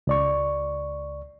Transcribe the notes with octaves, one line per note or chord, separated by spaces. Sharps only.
C#2 D5 C#6